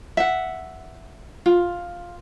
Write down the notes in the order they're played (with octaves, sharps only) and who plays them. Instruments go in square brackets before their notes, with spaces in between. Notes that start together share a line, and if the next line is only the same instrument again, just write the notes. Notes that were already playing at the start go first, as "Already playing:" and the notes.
[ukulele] E5 F#5
F4